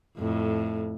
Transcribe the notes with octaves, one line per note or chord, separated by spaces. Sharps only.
F2 A2